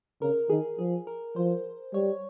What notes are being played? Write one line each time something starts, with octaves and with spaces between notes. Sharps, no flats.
C#3 A#4
D#3 G#4
F3 G#4
A#4
F3 C5
G3 C#5